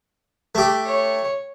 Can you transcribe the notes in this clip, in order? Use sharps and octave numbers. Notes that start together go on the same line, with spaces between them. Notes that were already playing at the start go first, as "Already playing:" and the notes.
A3 G4
C#5